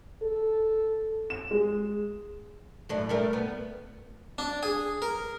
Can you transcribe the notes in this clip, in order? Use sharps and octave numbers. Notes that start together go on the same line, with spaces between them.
A4
E7
G#3
F#2 A2 D4
G3 A3 A#4
B3
D4
G#4
A#4